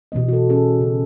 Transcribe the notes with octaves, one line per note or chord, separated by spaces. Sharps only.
B2 E3 B3 D#5
F#4 A4
C#4 G#4 A4
C#3